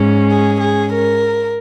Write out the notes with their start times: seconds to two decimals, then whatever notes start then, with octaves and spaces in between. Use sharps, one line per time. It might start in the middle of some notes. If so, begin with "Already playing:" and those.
Already playing: G#2 G#3 C#4
0.32 G#4
0.61 G#4
0.93 A#4